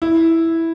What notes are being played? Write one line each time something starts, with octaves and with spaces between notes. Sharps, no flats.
E4